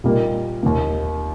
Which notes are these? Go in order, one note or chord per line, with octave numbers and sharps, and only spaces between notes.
A#2 G3 A#3 D#4 A#4
D#2 D#3 A#3